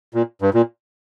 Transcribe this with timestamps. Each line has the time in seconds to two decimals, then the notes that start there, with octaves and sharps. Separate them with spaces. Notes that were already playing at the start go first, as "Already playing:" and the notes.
0.14 A#2
0.42 G2
0.54 A#2